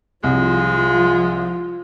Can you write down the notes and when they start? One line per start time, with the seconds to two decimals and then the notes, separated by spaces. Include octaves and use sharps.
0.24 C2 F3 G#3 F4